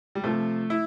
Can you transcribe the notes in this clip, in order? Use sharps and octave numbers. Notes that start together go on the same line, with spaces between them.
G3
C3 F3 A3
E4